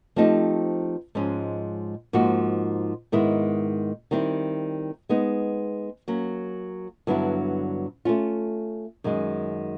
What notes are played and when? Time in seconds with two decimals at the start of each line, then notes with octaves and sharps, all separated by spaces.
0.16 F3 A3 C4 D#4 G4
1.15 G#2 F3 G#3 C#4
2.13 G#2 F3 A#3 D#4 F#4
3.12 G#2 D#3 G#3 B3 E4
4.11 D#3 G3 C4 E4
5.09 G#3 B3 D#4
6.08 F#3 A#3 C#4
7.07 G2 D3 F#3 B3 E4
8.05 A3 C#4 F4
9.04 F#2 D#3 G#3